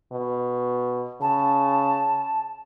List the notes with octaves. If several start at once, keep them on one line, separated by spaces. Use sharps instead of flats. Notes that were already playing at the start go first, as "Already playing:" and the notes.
B2
C#3 A5